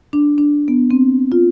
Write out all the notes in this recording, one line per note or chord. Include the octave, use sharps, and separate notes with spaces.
D4
D4
B3
C4
F4